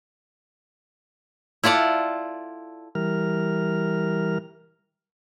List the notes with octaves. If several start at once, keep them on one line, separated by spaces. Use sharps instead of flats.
E4 F4 A4 D5 F#5
E3 G3 A#4 F6